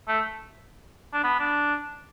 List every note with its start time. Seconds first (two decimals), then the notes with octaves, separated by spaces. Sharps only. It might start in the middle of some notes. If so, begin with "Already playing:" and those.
0.08 A3
1.13 D4
1.23 B3
1.39 D4